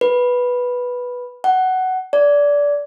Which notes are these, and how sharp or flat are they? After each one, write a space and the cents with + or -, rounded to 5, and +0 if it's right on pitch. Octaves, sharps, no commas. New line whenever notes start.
B4 -5
F#5 +10
D5 -20